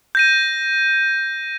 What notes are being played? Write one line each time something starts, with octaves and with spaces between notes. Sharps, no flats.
G6 A#6 D#7